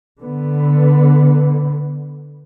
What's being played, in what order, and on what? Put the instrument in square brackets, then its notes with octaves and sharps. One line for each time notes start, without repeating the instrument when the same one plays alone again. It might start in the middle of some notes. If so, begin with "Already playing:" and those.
[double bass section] D3 B3